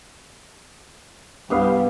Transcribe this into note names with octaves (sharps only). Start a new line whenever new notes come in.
C2 G2 G3 B3 F5